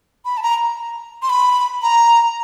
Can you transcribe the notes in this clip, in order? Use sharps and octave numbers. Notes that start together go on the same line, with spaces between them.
B5
A5
A#5
C6
B5
A#5